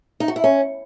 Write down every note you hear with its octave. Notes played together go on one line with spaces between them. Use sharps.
D#4
F#4
E4
C#4